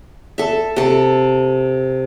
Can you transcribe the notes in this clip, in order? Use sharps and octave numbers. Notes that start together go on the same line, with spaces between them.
A4 E5
C3 A4